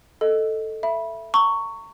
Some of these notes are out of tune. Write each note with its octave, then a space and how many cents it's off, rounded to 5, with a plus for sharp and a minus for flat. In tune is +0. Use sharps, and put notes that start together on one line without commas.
A4 +0 D#5 +0
E5 +15 B5 -20
A#5 -30 C#6 +10